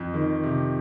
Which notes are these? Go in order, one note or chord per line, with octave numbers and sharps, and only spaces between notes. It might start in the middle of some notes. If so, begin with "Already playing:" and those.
Already playing: F2
D#3
C3